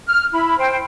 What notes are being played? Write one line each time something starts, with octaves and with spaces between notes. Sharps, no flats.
F6
E4 B5
C5 G5